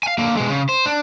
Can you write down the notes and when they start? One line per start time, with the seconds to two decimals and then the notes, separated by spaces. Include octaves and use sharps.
0.03 F5 G#5
0.18 D3 A#3
0.37 B2 G#3
0.50 C#3
0.69 C5
0.86 D4